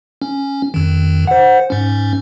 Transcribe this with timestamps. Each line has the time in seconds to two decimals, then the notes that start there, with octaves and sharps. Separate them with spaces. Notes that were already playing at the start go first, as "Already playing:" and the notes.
0.22 C#4
0.74 F2 D#3
1.27 C5 F#5
1.70 G#2 C#4